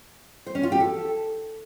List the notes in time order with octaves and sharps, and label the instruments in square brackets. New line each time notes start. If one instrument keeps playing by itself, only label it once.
[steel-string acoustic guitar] C5
C#4
F4
G4
A4